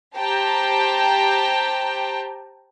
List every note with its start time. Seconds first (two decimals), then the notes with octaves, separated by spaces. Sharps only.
0.16 G4 C5 G5 A5 A#5